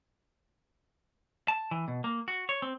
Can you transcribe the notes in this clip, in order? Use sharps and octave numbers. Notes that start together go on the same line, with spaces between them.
A5
E3
B2
A#3
F#4
C#5
C4